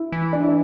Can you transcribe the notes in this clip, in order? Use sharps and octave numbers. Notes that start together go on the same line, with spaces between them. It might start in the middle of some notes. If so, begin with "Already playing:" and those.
Already playing: E4
E3
D4
E4
D4